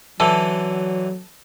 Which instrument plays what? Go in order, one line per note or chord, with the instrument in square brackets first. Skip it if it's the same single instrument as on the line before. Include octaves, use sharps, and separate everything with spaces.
[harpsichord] D3 E3 [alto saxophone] F#3 [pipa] A4